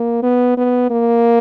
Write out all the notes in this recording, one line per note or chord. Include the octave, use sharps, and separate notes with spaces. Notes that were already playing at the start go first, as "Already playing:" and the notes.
Already playing: A#3
B3
B3
A#3